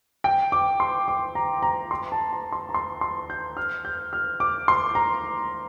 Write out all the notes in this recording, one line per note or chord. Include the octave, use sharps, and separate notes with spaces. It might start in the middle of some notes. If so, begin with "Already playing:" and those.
G5
D6
C6
D6
A#5
A#5
C6
A5
A#5
C6
A#5
C6
C6
G6
F6
G6
F6
D6
C6
A#5